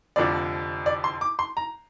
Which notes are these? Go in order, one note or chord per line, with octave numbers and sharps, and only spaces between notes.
F1 F2 D3 F3 D5
D5
C6
D6
C6
A#5